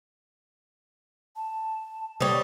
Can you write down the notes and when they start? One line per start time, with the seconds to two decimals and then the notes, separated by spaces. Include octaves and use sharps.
1.36 A5
2.21 G3 C#5 D#6